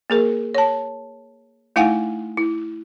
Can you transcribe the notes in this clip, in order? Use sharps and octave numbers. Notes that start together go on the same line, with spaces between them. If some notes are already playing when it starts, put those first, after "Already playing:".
A#3 G#4 A#4
C#5 A5
A3 D#4 E4 F5 F#5 G#5
E4